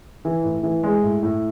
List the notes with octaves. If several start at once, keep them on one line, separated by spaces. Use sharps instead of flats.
E3
A2
E3
G#3
A2
A2